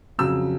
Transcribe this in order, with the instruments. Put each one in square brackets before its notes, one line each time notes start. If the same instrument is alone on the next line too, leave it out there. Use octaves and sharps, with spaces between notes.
[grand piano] F2 C#3 F#3 E6